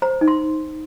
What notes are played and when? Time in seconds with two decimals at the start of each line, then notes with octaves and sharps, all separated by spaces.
0.02 C5 A#5
0.21 D#4
0.28 C6